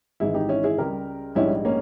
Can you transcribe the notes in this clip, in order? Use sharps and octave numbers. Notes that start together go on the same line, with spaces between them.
G#1 G#2 E3 E4 G#4
D#4 G4
C#4 E4
E4 G#4
C#2 C#3 G3 G4 A#4
A#1 G#2 G3 C#4 E4
A#3 C#4